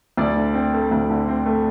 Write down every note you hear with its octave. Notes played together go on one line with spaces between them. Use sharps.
D2 D5
D3
C4
A3
D2
D3
C4
A3